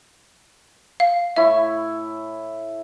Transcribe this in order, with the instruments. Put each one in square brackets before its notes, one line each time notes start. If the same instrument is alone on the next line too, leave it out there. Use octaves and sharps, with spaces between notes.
[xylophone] F5
[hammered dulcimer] A2 E4 C#6 [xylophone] E5